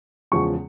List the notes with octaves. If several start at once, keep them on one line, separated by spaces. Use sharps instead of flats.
E2 C#3 F3 G#3 C#6